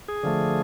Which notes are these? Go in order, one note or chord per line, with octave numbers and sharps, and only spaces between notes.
G#4
D3 F3 A3